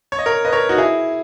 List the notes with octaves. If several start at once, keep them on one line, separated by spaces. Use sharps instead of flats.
C#5
D#5
A#4 C#5
B4 D#5
A#4 C#5
D#4 F#4
E4 G#4